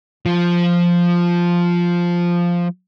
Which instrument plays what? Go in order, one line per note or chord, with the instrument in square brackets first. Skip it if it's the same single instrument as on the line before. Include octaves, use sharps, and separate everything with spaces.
[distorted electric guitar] F3 F4